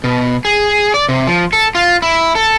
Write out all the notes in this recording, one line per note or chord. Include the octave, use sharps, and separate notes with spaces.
B2
G#4
D5
C3
F3
A4
F4
E4
A4